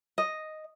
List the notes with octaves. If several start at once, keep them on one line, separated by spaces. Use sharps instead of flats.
D#5